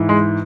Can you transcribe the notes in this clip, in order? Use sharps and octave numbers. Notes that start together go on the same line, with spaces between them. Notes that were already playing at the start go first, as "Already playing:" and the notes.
Already playing: G#2 E3
G#3